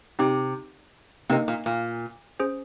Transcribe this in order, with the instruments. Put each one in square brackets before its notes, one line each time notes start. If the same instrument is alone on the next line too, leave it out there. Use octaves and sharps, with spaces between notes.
[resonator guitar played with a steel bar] C3 [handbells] C4 D#4 G4
[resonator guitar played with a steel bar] C3 [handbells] A#3 D#4 A#4 D#5
[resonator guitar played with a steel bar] A#2
A#2
[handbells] C#4 G#4 C5